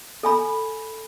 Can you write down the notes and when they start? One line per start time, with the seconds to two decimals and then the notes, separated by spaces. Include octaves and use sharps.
0.23 A4 G#5 B5